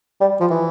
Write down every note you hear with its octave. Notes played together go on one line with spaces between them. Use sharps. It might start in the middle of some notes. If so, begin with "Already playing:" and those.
G3
F3
E3